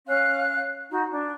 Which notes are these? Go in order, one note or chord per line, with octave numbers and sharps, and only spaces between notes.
C#4 F5 F#6
D#4 F#4
D4